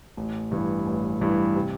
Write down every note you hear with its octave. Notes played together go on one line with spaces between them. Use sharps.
A1
G2 E3
A1
G2 E3
C3